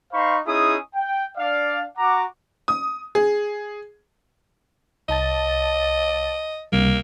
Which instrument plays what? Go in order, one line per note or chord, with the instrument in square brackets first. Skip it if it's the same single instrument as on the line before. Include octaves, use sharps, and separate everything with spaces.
[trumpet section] D#4 C5 F5 B5 C#6
C#4 D#4 E4 G#4 D#6
G5
D4 D5 F5
F#4 F#5 A#5 D6
[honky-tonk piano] D#6
G#4
[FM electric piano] C2 A5 A6 [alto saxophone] D#5
[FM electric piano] C#2 C3 G3 [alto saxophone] A#3